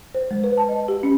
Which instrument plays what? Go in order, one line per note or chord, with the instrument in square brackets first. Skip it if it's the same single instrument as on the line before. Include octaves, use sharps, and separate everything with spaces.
[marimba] C5
G#3
B4
A5
D#5
G4
C#4